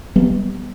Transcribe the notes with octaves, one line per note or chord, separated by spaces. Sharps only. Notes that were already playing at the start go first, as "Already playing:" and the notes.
G3 B3